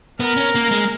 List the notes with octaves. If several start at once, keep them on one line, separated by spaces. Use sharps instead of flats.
B3 A#4
C#4
A#3
G#3